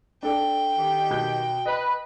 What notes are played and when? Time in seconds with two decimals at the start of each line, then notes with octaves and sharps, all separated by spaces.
0.23 D4 A4 D5 G5
0.77 D#3 G4
1.10 B2 G6
1.66 B4 D#5